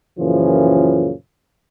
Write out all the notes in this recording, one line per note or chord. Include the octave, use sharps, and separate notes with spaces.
F#2 A#2 C#3 E3 F3